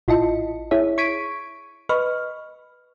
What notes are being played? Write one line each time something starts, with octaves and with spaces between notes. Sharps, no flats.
A1 E4 F4 D#5 A5 C#7
E4 G#4 C#5 E5
C#6 G#6 B6 D7 D#7
B4 D#5 B5 C#6 F6